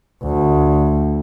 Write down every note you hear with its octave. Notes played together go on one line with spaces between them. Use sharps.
D2